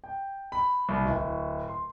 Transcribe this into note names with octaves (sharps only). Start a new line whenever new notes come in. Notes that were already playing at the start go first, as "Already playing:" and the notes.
G5
B5
C2
D1
C6